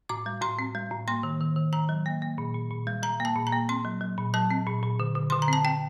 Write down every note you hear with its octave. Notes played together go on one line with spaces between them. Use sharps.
A2 D6
G3
A2 C6
C4
G3
A2
A#3 C6
D#3
D#3
D#3
D#3 A#5
F#3
A#3
A#3
A#2
A#2
A#2
G3
G3 A#5
A#3 A5
A#2
A#5
A#3
C4 C6
F#3
F#3
A#2
F#3 A5
C4
A#2
A#2
D3
D3
D3 C6
A#5
C4 A5
C4 G5